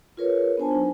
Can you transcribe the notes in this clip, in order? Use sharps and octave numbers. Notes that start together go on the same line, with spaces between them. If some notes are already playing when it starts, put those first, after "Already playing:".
F4 G#4 A#4 B4 C#5
B3 D4 C5 G#5 A5
F#3 D#4